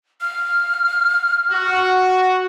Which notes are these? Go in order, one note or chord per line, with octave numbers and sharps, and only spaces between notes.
F6
F#4